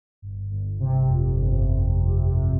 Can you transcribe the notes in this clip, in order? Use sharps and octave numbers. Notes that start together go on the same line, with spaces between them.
G1
G1
C3
F2
G1
G1